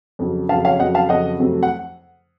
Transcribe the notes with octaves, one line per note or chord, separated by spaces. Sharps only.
F2 C#3 F#3
F2 C#3 F#3 F5 A5
C#5 F5
F2 C#3 F#3 D#5 F#5
F5 A5
F2 C#3 F#3 D#5 F#5
F2 C3 F#3 A3
F#5